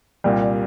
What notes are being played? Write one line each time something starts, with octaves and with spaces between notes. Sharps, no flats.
C2 A#2 G3